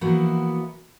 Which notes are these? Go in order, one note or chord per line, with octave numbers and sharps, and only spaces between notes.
E3 F3 A#3 B3 E4 F#4